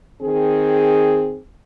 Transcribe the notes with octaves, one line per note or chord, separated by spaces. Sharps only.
D#3 C4 G#4